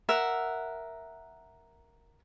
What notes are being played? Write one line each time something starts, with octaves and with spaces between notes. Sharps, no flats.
A#4 E5 F#5